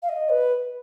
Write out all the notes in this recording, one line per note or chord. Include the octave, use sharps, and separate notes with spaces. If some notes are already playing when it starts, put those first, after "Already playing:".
F5
D#5
B4